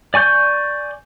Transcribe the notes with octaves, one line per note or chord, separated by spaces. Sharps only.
D5 G#5 C#6 G6